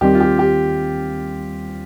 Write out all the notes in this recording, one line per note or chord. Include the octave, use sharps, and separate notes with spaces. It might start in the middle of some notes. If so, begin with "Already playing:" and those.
D#2 D#3 G3 C4 G4
F4
G4
G4